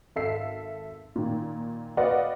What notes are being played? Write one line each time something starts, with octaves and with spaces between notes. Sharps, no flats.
G#1 A4 E5 F5 C7
A#2 D#3
F#4 B4 D5 D#5 F5 F#5